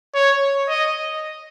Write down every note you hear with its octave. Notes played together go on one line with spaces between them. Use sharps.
C#5
D#5